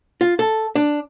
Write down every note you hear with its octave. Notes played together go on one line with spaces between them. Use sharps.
F4
A4
D4